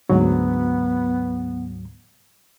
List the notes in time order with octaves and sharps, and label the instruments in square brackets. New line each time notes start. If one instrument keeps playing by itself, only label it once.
[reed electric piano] D2 G#2 F#3 [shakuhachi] B3